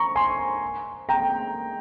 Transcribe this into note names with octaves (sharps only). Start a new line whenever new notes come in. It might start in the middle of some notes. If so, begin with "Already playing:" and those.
Already playing: A#5 C#6
G#5 C6
G5 A#5